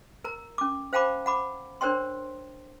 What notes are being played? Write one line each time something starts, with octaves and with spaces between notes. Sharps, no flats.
A#4 A#5
C#4 D6
C5 F5 G5 A5 B5 D6
F#5 B5 D6
D4 A#4 C5 C#5 G5 C6